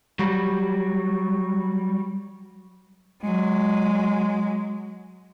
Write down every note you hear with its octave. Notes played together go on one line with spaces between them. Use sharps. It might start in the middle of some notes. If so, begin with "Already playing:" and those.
F#3 G3
F#3 G#3